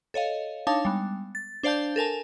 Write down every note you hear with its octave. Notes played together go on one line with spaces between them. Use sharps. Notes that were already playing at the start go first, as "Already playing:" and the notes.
A4 C#5 D#5 F5
D4 D#4 C#5 F5 A5
G3 G#3 B3
A6
D4 C5 D5 F5 A5 G6
A4 A#4 G#5 A5